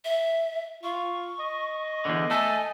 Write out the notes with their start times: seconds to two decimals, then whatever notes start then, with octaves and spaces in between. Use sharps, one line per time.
0.05 E5
0.83 F4 C#6
1.40 D#5
2.05 E2 G2 D3
2.31 A3 A4 G#5